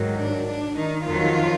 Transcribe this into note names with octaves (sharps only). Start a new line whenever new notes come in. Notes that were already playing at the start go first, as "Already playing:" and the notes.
Already playing: G#2 D#3 F#3
D4
D4
D#3 D#4
F2 D#3 F3 F#3 F4